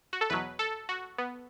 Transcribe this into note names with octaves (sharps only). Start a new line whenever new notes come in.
F#4
A4
E2 B2 F#3 B4
A4
F#4
B3